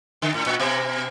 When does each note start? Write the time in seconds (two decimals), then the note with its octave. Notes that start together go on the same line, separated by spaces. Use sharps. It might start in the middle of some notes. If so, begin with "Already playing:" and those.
0.22 D3
0.34 A2
0.46 A#2
0.60 B2